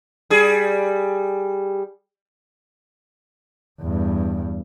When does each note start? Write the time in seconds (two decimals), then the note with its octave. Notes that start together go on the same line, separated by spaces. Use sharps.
0.30 G3 G#4
3.80 E2 G2